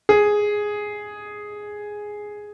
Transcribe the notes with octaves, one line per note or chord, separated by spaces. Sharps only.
G#4